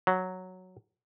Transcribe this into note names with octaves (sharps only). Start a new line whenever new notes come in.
F#3